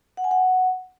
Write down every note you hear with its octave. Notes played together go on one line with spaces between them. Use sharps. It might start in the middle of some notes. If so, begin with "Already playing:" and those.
F#5
G#5
F#5